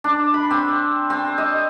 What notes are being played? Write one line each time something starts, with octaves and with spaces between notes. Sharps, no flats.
D4
B5
C4
C4
D#5